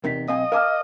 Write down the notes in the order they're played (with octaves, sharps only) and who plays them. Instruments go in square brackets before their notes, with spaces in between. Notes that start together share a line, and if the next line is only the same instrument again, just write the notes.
[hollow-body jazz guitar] E2 C3 D#4 [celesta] A#4 B6
[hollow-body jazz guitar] B1 C4 G#5 [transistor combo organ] D#5 [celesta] F5
[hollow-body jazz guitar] A#4 G#5 A5 [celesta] F5 D6 F6